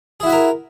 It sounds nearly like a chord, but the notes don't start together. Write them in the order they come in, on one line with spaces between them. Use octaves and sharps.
G#4 E4 F#4 E5 A#4